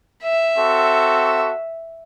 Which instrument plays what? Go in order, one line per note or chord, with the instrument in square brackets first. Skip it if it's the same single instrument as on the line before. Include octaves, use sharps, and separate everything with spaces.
[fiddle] E5
[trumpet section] C4 F#4 A4